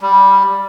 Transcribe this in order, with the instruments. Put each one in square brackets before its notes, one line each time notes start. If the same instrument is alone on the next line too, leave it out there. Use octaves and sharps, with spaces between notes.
[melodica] G3